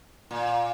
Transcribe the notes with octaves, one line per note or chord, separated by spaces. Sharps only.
A#2